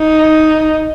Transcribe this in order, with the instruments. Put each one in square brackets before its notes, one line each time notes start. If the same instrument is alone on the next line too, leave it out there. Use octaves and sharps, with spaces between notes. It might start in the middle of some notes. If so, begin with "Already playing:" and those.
Already playing: [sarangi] D#4